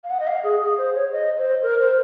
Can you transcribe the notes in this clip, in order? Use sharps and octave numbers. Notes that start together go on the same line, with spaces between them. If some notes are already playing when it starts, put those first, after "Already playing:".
F5
F#5
D#5
F5
G#4
G#4
C5
C#5
D#5
C5
A#4
C5